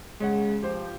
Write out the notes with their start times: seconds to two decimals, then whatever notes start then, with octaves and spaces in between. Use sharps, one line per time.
0.20 C#3 G#3 C#5 F#5
0.63 F3 G4 C5